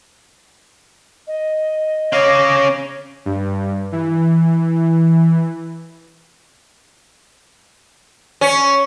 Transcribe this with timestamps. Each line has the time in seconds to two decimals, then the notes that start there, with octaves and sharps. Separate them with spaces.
1.27 D#5
2.13 C#4 C#5 F5 D6 A#6
3.26 G2
3.92 E3
8.41 C#4